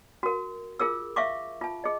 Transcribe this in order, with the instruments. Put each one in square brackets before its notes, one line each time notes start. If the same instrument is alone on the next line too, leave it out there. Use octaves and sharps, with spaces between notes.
[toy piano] F#4 A#4
F4 G#4 A#4 E6
E5 F5 C#6 D6
F4 A5
G#4 D#5